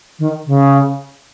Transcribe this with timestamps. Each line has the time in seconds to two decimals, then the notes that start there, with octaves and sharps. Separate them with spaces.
0.19 D#3
0.46 C#3